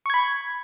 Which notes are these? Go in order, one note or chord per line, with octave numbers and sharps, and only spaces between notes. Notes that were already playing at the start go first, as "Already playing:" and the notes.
B5 C#6 G#6